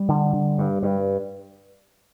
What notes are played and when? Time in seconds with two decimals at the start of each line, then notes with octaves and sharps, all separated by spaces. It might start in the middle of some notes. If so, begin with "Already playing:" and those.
Already playing: G3
0.08 D3
0.33 D3
0.58 G2
0.83 G2